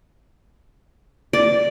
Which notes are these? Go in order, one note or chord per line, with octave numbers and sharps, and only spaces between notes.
D5